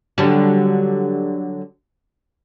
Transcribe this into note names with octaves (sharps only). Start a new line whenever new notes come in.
D3 F#3 G3